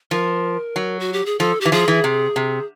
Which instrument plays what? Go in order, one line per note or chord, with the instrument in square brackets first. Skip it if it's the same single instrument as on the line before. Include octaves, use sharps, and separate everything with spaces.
[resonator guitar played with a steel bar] F3 [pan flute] A#4
[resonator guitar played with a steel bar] F#3
[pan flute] F#4
G4
G#4
[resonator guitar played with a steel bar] F3 [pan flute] A4
[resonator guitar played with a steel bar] E3 [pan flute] G4
[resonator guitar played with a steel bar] F3 [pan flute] G#4
[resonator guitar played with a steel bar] E3
C3
C3